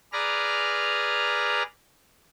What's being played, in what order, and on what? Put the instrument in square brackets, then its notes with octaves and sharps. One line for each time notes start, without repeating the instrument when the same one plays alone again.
[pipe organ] G#4 B4 D5 A#5 F6